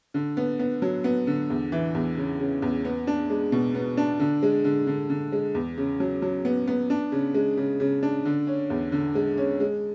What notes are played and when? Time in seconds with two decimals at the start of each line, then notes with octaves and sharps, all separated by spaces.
0.14 D3
0.37 B3
0.59 B3
0.82 F#3
1.04 B3
1.27 D3
1.50 E2
1.72 E3
1.95 E2
2.17 C#3
2.39 C#3
2.62 E2
2.85 B3
3.07 D4
3.30 G#3
3.52 B2
3.75 B3
3.97 D4
4.20 D3
4.43 G#3
4.64 D3
4.87 D3
5.10 D3
5.32 G#3
5.55 E2
5.78 C#3
6.00 F#3
6.22 F#3
6.45 B3
6.68 B3
6.90 D4
7.12 C#3
7.34 G#3
7.57 C#3
7.80 C#3
8.03 D4
8.25 D3
8.47 C#4
8.70 E2
8.92 D3
9.15 G#3
9.37 C#4
9.60 G#3